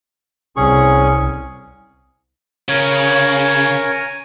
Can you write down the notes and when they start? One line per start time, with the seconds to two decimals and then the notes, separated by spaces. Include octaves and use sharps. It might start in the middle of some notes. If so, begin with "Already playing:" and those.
0.57 C2 C#4 G#4 C#6
2.69 C#3 A#4 C#5 G#5